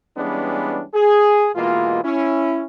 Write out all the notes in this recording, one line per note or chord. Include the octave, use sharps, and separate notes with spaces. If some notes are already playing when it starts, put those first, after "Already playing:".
E3 G3 G#3 B3 C#4 D4
G#4
B2 E3 G#3 A#3 F4
C#4 E4